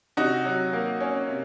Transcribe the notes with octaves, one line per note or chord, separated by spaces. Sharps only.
C3 D#4 F#4
F#3
A#3
C#4
C3